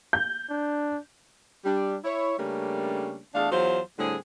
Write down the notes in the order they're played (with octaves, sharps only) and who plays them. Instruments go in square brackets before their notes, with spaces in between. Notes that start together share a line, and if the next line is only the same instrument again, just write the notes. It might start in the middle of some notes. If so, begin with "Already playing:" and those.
[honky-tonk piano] G6
[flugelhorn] D4
[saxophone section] G3 D4
E4 C#5
C#3 G3 A3 A#3 C#4 D4
E2 A3 D4 G#4 F5
E2 F#3 F4 C5
A2 D3 G3 C4 G#4